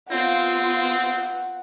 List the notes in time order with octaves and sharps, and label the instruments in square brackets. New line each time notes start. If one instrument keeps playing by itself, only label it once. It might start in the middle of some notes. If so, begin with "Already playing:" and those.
[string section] B3 F4 [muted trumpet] C4 [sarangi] F#5